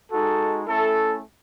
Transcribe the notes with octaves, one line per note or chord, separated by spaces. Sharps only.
G#3 D#4 F#4 A4
A3 C#4 E4 A4